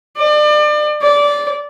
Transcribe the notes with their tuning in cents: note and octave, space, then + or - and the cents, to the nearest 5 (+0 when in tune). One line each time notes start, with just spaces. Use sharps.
D5 +35
D5 -15